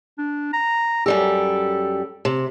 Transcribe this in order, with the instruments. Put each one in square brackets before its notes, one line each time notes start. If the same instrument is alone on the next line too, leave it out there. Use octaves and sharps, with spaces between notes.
[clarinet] D4
A#5
[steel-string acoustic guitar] F#2 G3 G4 [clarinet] A4
[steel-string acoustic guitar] C3